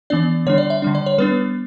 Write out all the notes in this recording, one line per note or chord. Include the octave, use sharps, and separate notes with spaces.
E3 B3 D4 D5
D3 G3 D4 C#5
D5
E5
D3 G3 D4
D5
C#5
G3 B3 D4 B4